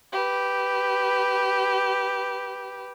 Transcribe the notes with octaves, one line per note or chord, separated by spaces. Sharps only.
G4 B4